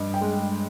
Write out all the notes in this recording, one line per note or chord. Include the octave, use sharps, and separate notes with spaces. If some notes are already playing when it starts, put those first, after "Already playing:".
Already playing: G2 D#5
G5
G#3